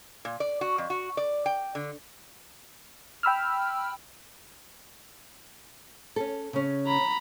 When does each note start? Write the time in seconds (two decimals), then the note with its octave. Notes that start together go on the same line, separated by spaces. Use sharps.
0.25 A#2
0.40 D5
0.61 F#4
0.78 F2
0.90 F#4
1.17 D5
1.46 G5
1.75 D3
3.23 G5 B5 E6 F6
6.16 C#4 A4
6.53 C#3 C#4
6.86 A#5 B5